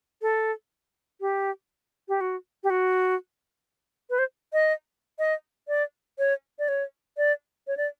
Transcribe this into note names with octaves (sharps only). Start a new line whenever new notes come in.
A4
G4
G4
F#4
G4
F#4
B4
C5
D#5
D#5
D5
C#5
D5
C#5
D5
C#5
D5